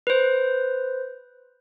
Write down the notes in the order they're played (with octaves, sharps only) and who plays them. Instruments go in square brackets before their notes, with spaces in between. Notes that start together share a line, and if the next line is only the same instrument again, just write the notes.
[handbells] B4 C5